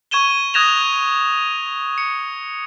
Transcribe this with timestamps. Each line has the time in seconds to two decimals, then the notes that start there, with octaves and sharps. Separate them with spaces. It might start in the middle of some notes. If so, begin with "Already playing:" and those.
0.11 C#6 G#6 D#7 E7 G7
0.54 D#6 F#6 G#6 A#6 E7 F7
1.98 C#7